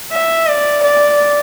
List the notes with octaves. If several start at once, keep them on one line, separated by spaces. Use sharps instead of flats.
E5
D5
D5